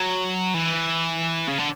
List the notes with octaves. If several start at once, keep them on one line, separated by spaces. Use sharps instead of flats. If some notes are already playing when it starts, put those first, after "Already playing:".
Already playing: F#3
E3
C#3
D3